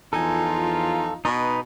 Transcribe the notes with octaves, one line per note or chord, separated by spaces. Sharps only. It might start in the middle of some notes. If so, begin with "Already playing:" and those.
E2 F3 D#4 F4 A4 G#5
B2 D#4 B4